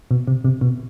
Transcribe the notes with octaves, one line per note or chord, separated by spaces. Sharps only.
B2
C3
C3
B2